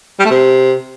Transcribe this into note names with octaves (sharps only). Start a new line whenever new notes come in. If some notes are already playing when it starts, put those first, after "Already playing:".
G3
A3
C3